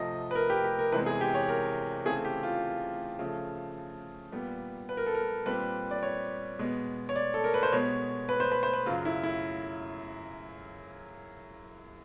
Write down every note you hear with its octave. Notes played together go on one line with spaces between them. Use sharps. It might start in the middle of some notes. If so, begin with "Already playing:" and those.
Already playing: C3 F3 A3 D#5
B4
A#4
G4
G4
A#4
E2 C3 E3 G#3 C4 B4
G#4
G4
C#5
A#4
C#3 E3 A3 C4 G#4
G4
F4
C#3 F3 A3
A#2 G3 B3
B4
A#4
A4
A#4
A#2 G3 C4 B4
D5
C#5
B2 G#3 B3
C#5
D5
A4
A#4
B4
C5
B2 G#3 B3 C#5
B4
C5
B4
C5
B4
F#2 C#3 F#3 F4
E4
E4